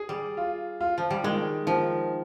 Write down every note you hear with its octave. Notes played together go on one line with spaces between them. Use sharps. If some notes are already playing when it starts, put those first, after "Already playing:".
Already playing: G#4
G3
F4
F4
F3
G3
D#3 G#3
D#3 F3